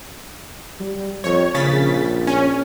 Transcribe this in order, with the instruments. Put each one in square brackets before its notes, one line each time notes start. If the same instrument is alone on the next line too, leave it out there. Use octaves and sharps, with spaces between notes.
[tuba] G3
[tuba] F2 [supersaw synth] C#5
[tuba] A#1 [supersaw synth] C#3 A6 B6
[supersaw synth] C#4